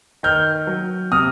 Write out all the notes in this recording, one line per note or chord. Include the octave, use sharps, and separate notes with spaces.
D#3 F6 G6
F#3
C3 D#6 F6